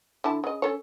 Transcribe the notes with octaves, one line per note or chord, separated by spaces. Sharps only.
D3 E4 A5
C#3 D#5
C#4 A4 C#5